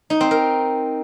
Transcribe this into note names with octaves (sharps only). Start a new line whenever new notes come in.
D#4
C4
A#4